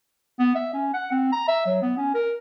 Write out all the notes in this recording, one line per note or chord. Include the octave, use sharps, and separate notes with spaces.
B3
E5
C#4
F#5
C4
A#5
E5
F#3
B3
C#4
A#4